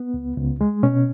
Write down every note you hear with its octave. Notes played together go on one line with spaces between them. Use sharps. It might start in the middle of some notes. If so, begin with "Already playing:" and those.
Already playing: B3
C#2
C#2
G#3
B2 C#4